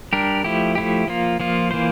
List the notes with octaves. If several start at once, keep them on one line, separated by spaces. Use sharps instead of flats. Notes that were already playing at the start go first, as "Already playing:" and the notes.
G3 D4 G4 A#4
F3 A3 E4 G4
F3 A3 E4 G4
F3 A#3 F4
F3 A#3 F4
E3 A#3 F4 C5